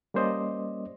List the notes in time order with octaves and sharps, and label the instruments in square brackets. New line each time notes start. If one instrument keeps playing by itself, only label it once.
[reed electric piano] G3 A#3 C#4 C5 D5 D#5